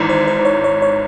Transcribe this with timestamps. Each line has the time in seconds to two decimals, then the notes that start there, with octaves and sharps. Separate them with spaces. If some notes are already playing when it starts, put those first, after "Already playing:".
Already playing: G#1 G#2 E3
0.09 C5
0.27 C5
0.45 C#5
0.64 C#5
0.82 C#5